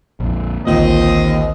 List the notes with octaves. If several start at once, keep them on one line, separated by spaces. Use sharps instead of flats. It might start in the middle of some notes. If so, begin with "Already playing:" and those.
A#1 F2
A1 D2 D#3 A#3 C4 F4 D#5